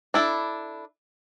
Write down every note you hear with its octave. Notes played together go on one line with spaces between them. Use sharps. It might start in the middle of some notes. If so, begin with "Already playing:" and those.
D4 E4 A4